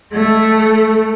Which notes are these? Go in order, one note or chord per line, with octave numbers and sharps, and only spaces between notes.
A3